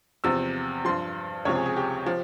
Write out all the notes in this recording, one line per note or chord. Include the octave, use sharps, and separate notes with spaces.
E2 C3 F3 E6
G2 F3 C6
C#2 C3 F3 C#5
G#4
G#4
G4
F3